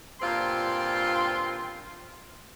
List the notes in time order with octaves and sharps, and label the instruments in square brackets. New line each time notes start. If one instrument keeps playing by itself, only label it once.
[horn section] G2 A#2 C4 F4 G5 C6